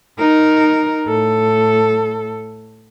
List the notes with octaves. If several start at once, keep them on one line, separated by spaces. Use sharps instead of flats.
D#4 A#4
A2 A4